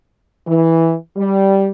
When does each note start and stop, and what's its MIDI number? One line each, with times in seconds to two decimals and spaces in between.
0.47 0.94 52
1.16 1.71 55